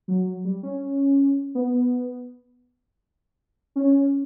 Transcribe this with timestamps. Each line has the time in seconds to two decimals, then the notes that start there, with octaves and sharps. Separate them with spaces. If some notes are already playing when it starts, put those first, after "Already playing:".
0.08 F#3
0.45 G3
0.63 C#4
1.55 B3
3.76 C#4